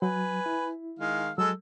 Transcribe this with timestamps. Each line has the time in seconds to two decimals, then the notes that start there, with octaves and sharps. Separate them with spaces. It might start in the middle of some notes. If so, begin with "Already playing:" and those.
0.02 F#3 B4 G#5
0.46 E4
0.99 D#3 G#3 F5
1.38 F#3 G#3 A4 E6